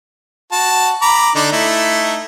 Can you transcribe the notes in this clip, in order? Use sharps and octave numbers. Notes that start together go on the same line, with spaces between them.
F#4 A5
A#5 B5 D6
D3 D4 D#4
A3 D#4 E4